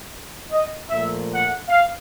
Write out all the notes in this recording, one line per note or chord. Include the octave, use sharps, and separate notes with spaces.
D#5
A#2 F3 A3 E5
F#5
F5